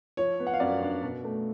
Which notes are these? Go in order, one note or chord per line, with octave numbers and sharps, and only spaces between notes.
F3 C#5
B3
F#5
F5
F#2 D5
D4
B2
A3